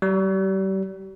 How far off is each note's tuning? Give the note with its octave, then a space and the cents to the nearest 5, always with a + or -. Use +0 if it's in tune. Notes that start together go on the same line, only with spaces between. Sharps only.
G3 -35